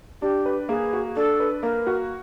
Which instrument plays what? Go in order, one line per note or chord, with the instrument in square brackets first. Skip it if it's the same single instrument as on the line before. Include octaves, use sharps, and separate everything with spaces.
[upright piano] D4 [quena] G4
[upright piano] B4
[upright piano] A#3 [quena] G#4
[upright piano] F#4
[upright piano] D4 [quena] A4
[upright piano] B4
[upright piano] A#3 [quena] A#4
[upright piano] F#4